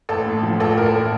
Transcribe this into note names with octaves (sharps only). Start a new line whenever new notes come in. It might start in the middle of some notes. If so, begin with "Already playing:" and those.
A1 A4
A2
F3
A1 A4
A1 A#4
A4
A2